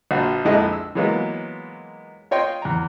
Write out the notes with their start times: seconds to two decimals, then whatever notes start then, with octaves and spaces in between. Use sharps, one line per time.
0.11 A#1 F4 F#4
0.45 A#1 F2 D3 G#3 E4 D#5
0.73 E6
0.95 E3 F#3 G#3 A#3 B3 F4
2.31 F4 C#5 D#5 G5 C6
2.62 E2 A#5